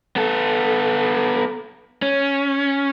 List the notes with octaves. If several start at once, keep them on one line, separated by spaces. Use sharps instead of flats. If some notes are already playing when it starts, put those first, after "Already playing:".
B3 A4
C#4